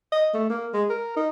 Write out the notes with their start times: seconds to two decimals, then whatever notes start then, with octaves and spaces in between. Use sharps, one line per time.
0.12 D#5
0.34 A3
0.50 A#3
0.73 G#3
0.90 A#4
1.17 D#4